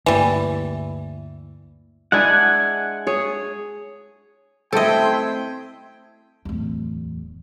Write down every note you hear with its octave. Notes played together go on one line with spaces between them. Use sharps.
D2 G2 E3 G3 A#3
G#3 D4 E4 F#5 G#5
G#4 C#5
A3 C4 E4 A4 D#5 G5 C6 G#6
D1 E2